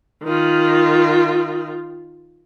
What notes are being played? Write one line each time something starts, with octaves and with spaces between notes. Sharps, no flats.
D#3 F4